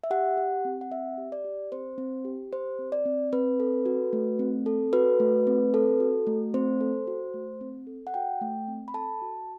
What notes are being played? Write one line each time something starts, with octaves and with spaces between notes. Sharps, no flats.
E5
G4 F#5
G4
C4
F#5
C4 E5
G4
D5
G4
C4 C5
C4
G4
G4 C5
C4
D5
C4
C4 B4
A4
F#4
A3
C4
A4
F#4 B4
A3
C4
A4
F#4
A3
C4 C5
A4
F#4
A3
C4
A4
F#5
F#4 G5
A3
C4
B5
A4 A5
F#4